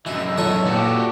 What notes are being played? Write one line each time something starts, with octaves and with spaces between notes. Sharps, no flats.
F#2 E3 E4 D#5
D#4 F4 A4 C#5 E5
A#2 F#4 G4